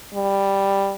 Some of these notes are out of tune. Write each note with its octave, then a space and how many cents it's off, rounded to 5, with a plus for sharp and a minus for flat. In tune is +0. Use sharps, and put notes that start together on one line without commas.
G3 +5